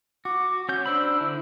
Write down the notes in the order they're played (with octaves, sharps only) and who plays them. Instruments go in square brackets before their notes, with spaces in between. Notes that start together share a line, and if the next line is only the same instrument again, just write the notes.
[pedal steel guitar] F#4 [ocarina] D6
[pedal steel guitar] C#4 G6 [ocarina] F#5
[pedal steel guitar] D4 C5 B5 [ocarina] E6
[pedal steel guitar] D3 E4